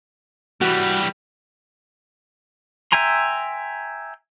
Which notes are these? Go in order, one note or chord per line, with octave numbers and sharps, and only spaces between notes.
E3 G3 F#4
E5 G5 G#5 A#5 C6